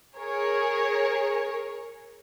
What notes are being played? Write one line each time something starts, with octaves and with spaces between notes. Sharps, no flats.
G#4 A#4 C#5